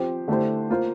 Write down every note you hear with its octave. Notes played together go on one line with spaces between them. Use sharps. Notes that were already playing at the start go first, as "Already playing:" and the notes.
Already playing: F3 C4 G4 C5
D3 A3 E4 G4 C5
A#3 F4 C5